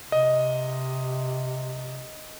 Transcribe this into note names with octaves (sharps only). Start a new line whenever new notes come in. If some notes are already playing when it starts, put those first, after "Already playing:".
C3 D#5